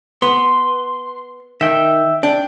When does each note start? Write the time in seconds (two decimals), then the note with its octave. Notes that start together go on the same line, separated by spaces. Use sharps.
0.22 B3 C6
1.61 D#3 E5 G5
2.23 D4 G5